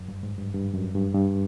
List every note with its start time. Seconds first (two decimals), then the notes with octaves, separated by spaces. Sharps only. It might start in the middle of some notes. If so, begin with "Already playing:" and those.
Already playing: F#2
0.08 G2
0.23 G#2
0.38 G2
0.54 G2
0.74 F#2
0.95 G2
1.15 G2